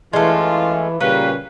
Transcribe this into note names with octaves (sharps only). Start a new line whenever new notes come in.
F#2 E3 G#3 A3 F4 F5
A#2 C#3 F#3 G3 A#3 C#4 B4